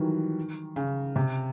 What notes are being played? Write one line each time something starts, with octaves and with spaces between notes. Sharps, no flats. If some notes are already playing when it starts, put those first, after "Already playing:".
Already playing: D#3 E3 F#3 G3
C#3
C3